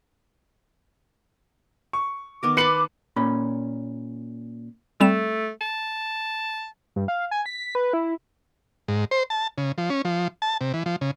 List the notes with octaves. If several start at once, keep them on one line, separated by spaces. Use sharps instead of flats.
C#6
D#3 B3 A#4 D6
B4 A5 B5 C6 C#7 F#7
A#2 C#4 B5
G3 A3 C4 E7
A5
G2
F5
G#5
B6
B4
E4
G#2
C5
A5
C#3
F3
C#4
F3
A5
C3
E3
F3
C#3